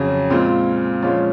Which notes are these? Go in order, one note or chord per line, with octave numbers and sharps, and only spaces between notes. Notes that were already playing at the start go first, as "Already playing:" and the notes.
Already playing: F2 C#3 F#3 C#4 G#4
A#2 G#3 C4 F4
A#2 F3 G#3 C#4 F4